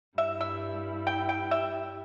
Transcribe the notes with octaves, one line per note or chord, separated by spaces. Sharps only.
G2 G3 E4 E5
E5
G5
G5
E5